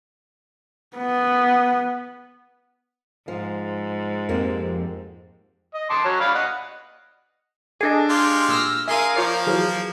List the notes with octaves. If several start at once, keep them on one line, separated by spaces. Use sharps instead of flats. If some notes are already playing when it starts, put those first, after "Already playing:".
B3
G#2 F3
F2 A#3 C4 G4
D#5
A5 C6 D6
F#3 C#4
D5 F5 B5
D#5 F#5
D4 G#4 A4 D#5
G#3 F4 G4
A#2 E6 F6 A#6
G#4 A#4 E5 F5 C6 D#7
F3 A#3 F4 C#5 D5
E3 F#3 G#4